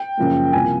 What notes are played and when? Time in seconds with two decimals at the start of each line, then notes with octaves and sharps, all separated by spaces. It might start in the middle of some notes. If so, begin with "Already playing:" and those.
Already playing: G5
0.17 F#2 C#3 F3 A#3
0.53 C2 C3 F3 A#3 G#5